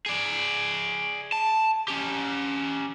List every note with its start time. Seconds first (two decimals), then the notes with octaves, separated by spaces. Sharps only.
0.06 G#4 D5
1.32 A5
1.88 C#4 G4